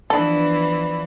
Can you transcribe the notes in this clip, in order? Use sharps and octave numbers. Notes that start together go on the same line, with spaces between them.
E3 F3 B3 D4 A4 B5